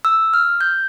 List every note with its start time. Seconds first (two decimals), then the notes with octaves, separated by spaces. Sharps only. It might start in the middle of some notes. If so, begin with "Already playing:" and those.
0.05 E6
0.34 F6
0.61 G6